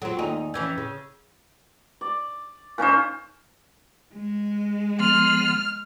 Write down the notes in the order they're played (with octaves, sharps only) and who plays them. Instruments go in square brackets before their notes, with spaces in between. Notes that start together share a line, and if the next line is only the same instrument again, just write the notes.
[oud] F#3 C4 [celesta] F4 G#4 A4
[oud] D#2 D#4 [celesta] D5 G#5
[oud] F2 E3 C#4 [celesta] E6 G6 G#6
[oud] C#3
[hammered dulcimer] D5
A#2 C#4 D#4 C5
[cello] G#3
[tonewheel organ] F3 B3 [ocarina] C6 [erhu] F6